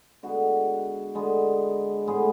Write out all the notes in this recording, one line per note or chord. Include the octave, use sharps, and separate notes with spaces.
D3 G#3 B3 F#4
D3 G#3 B3
A2 G#3 B3 G#4